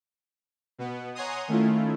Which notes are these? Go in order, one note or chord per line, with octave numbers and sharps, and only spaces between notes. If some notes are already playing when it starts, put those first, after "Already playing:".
B2 B3
C#5 F#5 G#5 A#5 C6 D#6
D#3 A3 C#4 E4 F4